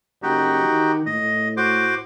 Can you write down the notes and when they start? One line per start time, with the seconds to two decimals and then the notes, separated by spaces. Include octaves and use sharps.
0.23 F#1 D#4 F#4 G4
0.65 D#3
1.06 A2 D#5
1.57 F#4 C5 D6